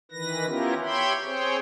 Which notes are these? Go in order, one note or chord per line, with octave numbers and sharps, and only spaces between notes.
D#3 E3 B4 A#6
B3 C#4 E4 F4 G4 A#4
G4 C#5 E5 G5 B5 C6
C4 G#4 C5 C#5 G5